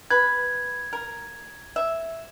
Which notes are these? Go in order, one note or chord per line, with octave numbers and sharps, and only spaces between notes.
B4 G#6
A#4
E5